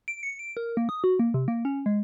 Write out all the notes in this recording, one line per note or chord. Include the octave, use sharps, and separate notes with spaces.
D7
C#7
D7
A#4
A#3
D#6
F#4
A#3
C3
A#3
C#4
G#3